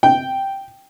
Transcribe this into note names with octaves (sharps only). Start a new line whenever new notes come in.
G5